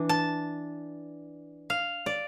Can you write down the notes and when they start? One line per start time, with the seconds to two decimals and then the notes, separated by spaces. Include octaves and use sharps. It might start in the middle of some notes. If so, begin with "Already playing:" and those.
Already playing: E3 D4
0.09 A5
1.70 F5
2.06 D5